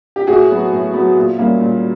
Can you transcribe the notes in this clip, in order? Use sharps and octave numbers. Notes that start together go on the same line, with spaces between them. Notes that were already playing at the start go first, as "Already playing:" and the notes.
G4
A2 F#4 G#4
F#3 B3
A2
F#3 B3
A#2
G3 A#3 C#4
A#2